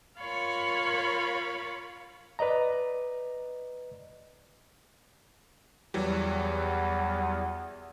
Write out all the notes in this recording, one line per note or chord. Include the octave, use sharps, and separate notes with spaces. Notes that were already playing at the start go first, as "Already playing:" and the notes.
F4 A#4 C#5 F5 B5 C#6
B4 D5 D#5 A#5
E2 E3 F#3 G3